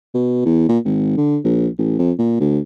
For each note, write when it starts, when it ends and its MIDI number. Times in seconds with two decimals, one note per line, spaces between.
0.14 0.44 47
0.46 0.65 40
0.69 0.79 46
0.85 1.15 32
1.17 1.38 50
1.44 1.67 34
1.79 1.95 33
1.99 2.12 41
2.19 2.39 46
2.40 2.59 38